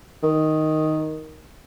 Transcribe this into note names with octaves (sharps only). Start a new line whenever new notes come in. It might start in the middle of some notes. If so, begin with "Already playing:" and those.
D#3